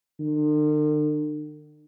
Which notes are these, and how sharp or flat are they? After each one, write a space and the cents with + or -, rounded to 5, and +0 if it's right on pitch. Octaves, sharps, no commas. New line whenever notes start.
D3 +45